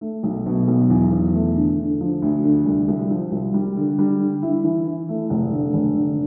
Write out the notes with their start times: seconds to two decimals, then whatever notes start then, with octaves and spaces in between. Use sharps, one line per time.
0.01 A3
0.23 B1
0.46 B2
0.68 B1
0.90 E2
1.12 E2
1.34 A3
1.56 D3
1.78 D3
2.01 F3
2.22 D2
2.44 D3
2.65 C2
2.88 C2
3.11 F3
3.32 C2
3.54 G3
3.76 D3
3.99 G3
4.21 D3
4.42 E4
4.64 E3
4.87 E4
5.09 A3
5.30 F1
5.52 D3
5.74 F1
5.97 D3